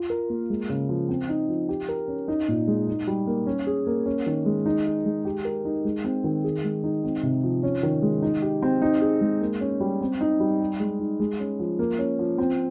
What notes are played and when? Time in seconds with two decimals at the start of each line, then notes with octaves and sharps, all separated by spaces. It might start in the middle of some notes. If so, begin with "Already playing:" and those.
Already playing: F4
0.10 A#4
0.30 A#3
0.50 G#3
0.69 C#3
0.89 F3
1.09 C4
1.29 D#4
1.49 F3
1.69 G4
1.89 A#4
2.08 C#4
2.28 D#4
2.48 A#2
2.68 G#3
2.87 D#4
3.07 G3
3.27 A#3
3.47 C#4
3.67 G#4
3.87 A#3
4.06 C#4
4.26 D#3
4.46 G#3
4.66 D#4
4.86 G#4
5.05 G#3
5.25 G4
5.45 A#4
5.65 D#4
5.85 G#3
6.04 C4
6.24 D#3
6.44 G#4
6.64 G#3
6.84 D#4
7.04 C4
7.23 C3
7.43 F3
7.63 C#4
7.83 D#3
8.02 G#3
8.22 D#4
8.42 G4
8.62 C4
8.82 D#4
9.02 G#4
9.21 G#3
9.41 A#3
9.61 C#4
9.80 G3
10.01 C4
10.21 D#4
10.40 G3
10.60 G4
10.80 G#3
11.00 D#4
11.20 G#3
11.40 C#4
11.60 F3
11.79 A#3
11.99 C#4
12.19 F3
12.38 C4